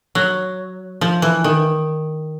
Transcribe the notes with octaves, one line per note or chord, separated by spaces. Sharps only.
F#3
F3
E3
D#3